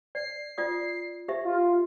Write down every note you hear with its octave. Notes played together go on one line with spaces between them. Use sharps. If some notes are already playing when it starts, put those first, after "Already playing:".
D5 C7
F4 D5 D#6
G4 E5
F4